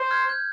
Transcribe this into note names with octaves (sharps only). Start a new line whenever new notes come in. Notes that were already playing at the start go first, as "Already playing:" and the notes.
Already playing: C5
F6 G#6
G6